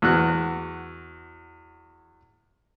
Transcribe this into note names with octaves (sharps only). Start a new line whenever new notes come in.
E2 F#4 F#6